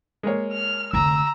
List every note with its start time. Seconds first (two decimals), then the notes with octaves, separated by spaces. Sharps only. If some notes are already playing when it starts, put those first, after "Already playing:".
0.23 G#3 A#3 C#5
0.52 F6
0.93 F1 D3 A#5 E6